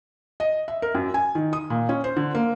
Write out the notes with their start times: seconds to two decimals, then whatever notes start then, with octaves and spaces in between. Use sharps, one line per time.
0.40 D#5
0.68 E5
0.82 A#4
0.95 F#2
1.14 G#5
1.35 D#3
1.53 D#6
1.70 A#2
1.89 C#4
2.04 C5
2.16 D3
2.35 A#3